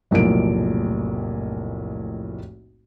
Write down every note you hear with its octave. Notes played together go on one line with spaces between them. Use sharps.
F1 B1 A2 F3 A#3 D7